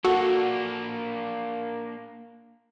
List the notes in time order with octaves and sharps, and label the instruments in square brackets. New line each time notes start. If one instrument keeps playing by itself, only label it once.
[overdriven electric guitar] A#3 D4 [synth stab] F#4 A4 F#5